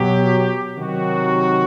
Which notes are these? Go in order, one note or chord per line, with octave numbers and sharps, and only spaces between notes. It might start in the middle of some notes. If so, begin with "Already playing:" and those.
Already playing: B2 F#3 G4
C3 D#3 F#3 F#4